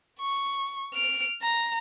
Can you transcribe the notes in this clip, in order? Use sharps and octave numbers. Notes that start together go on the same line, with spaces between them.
C#6
F6 D7
A#5